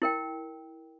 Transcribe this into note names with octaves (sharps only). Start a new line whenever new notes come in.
E4 A#4 G5